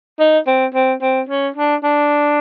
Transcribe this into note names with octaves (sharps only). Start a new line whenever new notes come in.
D#4
C4
C4
C4
C#4
D4
D4